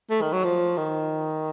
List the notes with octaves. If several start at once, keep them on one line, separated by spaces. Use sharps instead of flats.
A3
D#3
F#3
F3
D#3